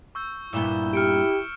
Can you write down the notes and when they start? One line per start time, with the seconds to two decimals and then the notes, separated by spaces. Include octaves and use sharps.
0.15 C#6 E6 G6
0.53 G2 A#2 B3 E4 E6 E7 G7
0.94 G4 F6 C#7 D7